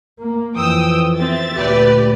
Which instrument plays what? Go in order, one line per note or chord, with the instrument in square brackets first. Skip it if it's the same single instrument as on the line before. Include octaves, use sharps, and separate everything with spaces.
[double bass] A#3
[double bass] F2 E3 [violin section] G5 D#6 E6
[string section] C4 [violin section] E5 A6
[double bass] D2 A#2 [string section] G4 B4 D5